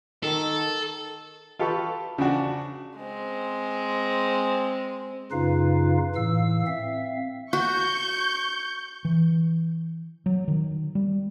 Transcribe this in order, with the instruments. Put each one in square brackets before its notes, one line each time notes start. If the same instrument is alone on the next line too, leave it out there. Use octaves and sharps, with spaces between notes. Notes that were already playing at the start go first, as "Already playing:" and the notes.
[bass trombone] D#3 [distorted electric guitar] A4
[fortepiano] F4 G4 A4 B4 C#6
C#3 F3 D4 F#4
[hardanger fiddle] G#3 C4
[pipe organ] F#2 C#3 D#4 F4 B4 F5
A2 E3 F5 E6
C4 E5 F5
[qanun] F#4 [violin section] C#6 G6
[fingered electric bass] E3
F#3
D#3
G3